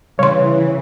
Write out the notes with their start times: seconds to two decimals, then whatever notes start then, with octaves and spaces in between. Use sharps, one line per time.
0.19 C#3 E3 G3 C#5 C6